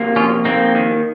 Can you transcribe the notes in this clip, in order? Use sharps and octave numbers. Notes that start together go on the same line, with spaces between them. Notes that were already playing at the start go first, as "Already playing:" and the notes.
Already playing: C3 A#3
F2 C#4 F4
A#3 C4 D#4
D#3